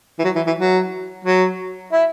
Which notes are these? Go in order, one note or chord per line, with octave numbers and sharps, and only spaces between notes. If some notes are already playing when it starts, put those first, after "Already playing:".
E3
F#3
E3
E3
F#3
F#3
E4